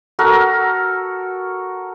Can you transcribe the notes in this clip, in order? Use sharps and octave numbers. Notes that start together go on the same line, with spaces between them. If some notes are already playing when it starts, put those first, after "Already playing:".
F#4 A4 A#4